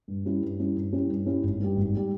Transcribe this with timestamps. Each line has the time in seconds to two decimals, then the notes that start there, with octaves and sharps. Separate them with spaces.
0.08 G2
0.25 G3 C#4 E4
0.42 G2
0.59 G3 C#4 E4
0.76 G2
0.92 G3 C#4 E4
1.09 G2
1.26 G3 C#4 E4
1.43 G#1
1.60 G2 G3
1.77 G#1
1.97 G3